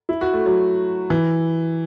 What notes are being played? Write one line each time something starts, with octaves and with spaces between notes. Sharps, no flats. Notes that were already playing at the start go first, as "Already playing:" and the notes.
E4
F#4
A3
F#3
E3